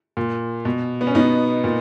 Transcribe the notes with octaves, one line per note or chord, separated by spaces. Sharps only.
A#2
B2
B3
C#4
B2 B3 D#4
A#2